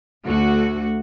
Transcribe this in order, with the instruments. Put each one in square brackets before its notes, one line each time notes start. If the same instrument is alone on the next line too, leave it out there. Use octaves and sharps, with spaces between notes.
[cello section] D2 A3 F#4